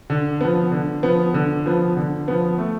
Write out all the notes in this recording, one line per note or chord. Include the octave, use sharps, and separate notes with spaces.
D3
F3 B3
D3
F3 B3
D3
F3 B3
D3
F3 B3
A3